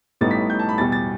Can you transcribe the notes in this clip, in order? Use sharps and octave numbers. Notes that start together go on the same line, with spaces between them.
A1 A2 G3 B3 D#4 A6
B6
G6
A5
B5
E2 B2 G3 A6
A6